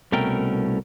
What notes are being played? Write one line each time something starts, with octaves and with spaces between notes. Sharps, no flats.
C2 B2 A3 C#4 A#4 G5